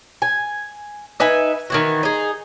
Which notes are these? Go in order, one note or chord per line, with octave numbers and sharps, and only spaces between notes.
G#5
D#4 B4 E5 G#5
D#3 E3 F#4
D#4 G#4